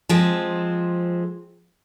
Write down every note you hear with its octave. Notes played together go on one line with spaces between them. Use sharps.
F3 G#3 C4